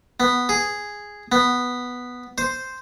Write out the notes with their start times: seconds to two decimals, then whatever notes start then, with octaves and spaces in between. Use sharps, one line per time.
0.20 B3
0.49 G#4
1.32 B3
2.38 C5